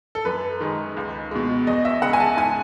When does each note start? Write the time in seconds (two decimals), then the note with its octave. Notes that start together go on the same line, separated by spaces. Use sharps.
0.15 A4
0.25 F#2 B4
0.61 D#3 G#3
0.97 C#2
1.31 B2 G#3
1.67 E2 D#5
1.85 E5
2.02 C#3 G#3 F#5
2.13 G#5
2.20 A5
2.37 G#2 G#5